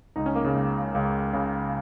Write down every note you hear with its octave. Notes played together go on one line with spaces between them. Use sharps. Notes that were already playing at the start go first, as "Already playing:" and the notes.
C#2 D#4
C#4
A#3
C#3 C#4
C#2
C#2
C#3